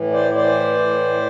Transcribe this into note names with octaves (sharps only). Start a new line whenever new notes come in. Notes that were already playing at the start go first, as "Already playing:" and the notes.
Already playing: A2 E3
C5 D5
E3 C5 D5
A2